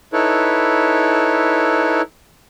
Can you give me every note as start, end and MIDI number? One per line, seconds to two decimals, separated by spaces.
0.13 2.02 63
0.13 2.02 64
0.13 2.02 69
0.13 2.02 71
0.13 2.02 73